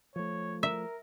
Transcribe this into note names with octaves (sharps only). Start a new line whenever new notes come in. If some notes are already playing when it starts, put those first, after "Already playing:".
F3 A3 C#5
A#4 E5